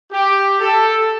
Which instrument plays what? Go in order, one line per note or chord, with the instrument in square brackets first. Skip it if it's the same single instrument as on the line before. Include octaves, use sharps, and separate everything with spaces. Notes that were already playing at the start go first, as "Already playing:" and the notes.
[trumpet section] G4
A4